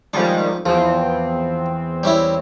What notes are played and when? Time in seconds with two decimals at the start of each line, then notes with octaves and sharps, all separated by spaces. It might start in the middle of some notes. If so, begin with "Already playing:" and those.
0.14 F2 D#3 G3 G#3 D4
0.66 E2 F3 C4
2.03 G3 C#4 E4